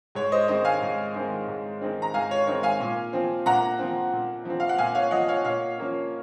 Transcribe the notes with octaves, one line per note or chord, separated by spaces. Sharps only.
G#2 C#5
C5 D#5
D#3 G#3 C4 C5 D#5
F5 G#5
G#2
D#3 G#3 C4
G#2
D#3 G#3 C4
A#5
G#2 F5 G#5
C#5
D#3 G#3 C4 C#5
F5 G#5
A#2
F3 C4
A#2 F#5 A#5
F3 C4
A#2
F3 C4
F5
F#5
A#2 F5 G#5
C#5 F5
F3 C4 D#5 F#5
C#5 F5
A#2 C#5 F5
F3 A#3 C#4